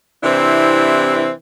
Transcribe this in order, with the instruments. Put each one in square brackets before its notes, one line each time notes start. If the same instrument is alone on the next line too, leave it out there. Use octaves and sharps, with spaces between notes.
[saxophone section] C3 E3 C4 D4 E4